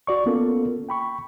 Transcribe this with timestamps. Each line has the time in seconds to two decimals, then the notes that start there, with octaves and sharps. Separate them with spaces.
0.07 F#4 D5 C#6
0.26 A#3 B3 C#4 F4 A4 A#4
0.89 G5 B5 C#6